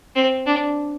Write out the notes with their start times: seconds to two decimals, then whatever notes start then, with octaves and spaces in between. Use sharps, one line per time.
0.15 C4
0.47 D4